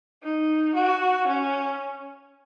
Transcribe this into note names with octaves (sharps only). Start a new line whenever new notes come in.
D#4
F#4
C#4